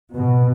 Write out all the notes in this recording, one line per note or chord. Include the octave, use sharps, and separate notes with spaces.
B2